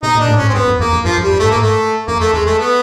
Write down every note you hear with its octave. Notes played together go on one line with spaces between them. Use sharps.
B2 D#4
A#2
D4
A2
G#2 C#4
C4
G2 B3
F2
E2 A#3
F2
F#2 F3
F2
G3
F#2
G2 A3
G#2 A#3
A3
F2 A#3
A3
E2 G#3
A3
B3